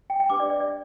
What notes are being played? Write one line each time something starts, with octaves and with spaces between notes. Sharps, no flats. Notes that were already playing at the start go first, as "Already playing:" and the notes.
G5
G5
D4 G4 B4 D6
D5
D5
D5